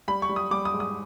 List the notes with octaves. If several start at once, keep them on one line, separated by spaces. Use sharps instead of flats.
G3 B5
C#6
G3
D#6
G3 D6
D#6
G#2
D#6